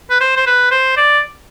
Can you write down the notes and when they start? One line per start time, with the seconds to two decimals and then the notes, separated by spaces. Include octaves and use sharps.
0.10 B4
0.20 C5
0.36 C5
0.47 B4
0.71 C5
0.97 D5